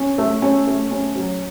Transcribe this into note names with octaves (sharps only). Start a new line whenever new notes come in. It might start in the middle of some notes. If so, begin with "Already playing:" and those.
Already playing: C#4
A3
C#4
A3
C#4
F#3